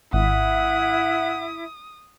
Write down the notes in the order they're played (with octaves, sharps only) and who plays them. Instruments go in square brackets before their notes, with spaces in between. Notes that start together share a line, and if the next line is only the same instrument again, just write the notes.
[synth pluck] G#1 [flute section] E4 E5 [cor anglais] F#5 [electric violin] D#6